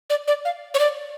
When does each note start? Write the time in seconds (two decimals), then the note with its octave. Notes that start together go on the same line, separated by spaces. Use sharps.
0.10 D5
0.28 D5
0.45 F5
0.74 C#5
0.79 D5